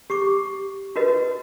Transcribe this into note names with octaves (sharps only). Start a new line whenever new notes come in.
G4 C#6 D6
F4 F#4 A#4 B4 D#5